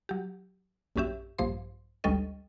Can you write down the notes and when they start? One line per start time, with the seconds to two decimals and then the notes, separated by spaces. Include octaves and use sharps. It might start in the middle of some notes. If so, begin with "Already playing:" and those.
0.09 F#3 G4
0.96 A#1 F#2 C#4 G4 E5
1.38 A#1 G2 F3 C5 C6
2.04 G#1 D2 G3 C#4 A4 D#5